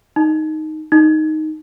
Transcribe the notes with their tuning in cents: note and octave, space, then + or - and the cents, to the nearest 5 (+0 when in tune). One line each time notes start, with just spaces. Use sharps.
D#4 +0
D#4 +0